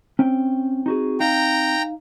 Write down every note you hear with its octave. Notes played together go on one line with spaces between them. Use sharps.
C4 C#4 G5
D#4 F#4 G#4
D#4 F5 G5 A#5